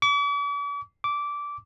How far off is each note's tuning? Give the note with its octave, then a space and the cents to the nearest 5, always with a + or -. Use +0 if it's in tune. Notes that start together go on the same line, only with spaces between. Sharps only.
D6 -45
D6 -15